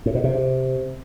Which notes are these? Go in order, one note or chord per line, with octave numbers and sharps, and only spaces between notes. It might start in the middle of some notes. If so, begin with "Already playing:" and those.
A2
B2
C3